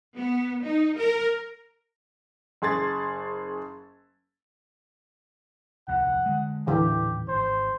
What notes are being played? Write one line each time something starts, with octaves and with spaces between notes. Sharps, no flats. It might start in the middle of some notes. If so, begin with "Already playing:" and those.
B3
D#4
A#4
F#1 G#4 C6 G#6 A6
D#1 C2 F2 F#5
D3 G#3
D#1 A2 D3 E3 G4
G#1 C5